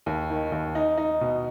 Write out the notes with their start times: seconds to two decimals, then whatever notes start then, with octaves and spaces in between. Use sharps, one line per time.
0.06 D#2
0.30 D#3
0.52 D#2
0.75 D#4
0.98 D#4
1.21 B2